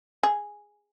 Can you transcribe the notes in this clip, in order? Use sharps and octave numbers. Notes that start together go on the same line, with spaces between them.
G#4